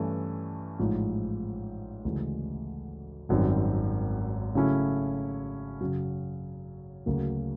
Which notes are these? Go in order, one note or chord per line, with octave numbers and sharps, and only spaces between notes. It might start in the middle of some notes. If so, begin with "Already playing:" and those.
Already playing: G2 E3 A3 C#4
A1 G#2 F3
D2 C#3 E3 G#3
G#1 F#2 D#3 G3 C4
C#3 F#3 A3 C#4 E4
F#2 C#3 F#3
D2 C#3 F#3 A#3